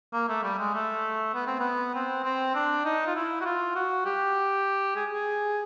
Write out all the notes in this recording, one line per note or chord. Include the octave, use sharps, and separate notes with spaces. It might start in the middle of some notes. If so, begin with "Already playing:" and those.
A#3
A3
G3
G#3
A3
B3
C4
B3
C4
C4
D4
D#4
F4
E4
F#4
F4
F#4
G4
G#4
G#4